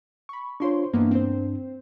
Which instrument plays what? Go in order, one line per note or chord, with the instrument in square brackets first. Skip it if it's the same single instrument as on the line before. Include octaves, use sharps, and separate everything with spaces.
[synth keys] B5 C#6
[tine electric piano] D4 F4 C#5 [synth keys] C5 C6 C#6
[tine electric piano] G2 D4 [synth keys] E3 A#3 B3
[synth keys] C4 C5